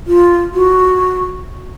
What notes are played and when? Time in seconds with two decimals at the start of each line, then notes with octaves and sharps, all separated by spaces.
0.07 F4
0.54 F#4